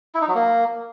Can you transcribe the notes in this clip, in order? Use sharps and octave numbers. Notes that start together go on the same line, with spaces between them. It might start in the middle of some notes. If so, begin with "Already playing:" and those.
E4
D#4
F#3
A#3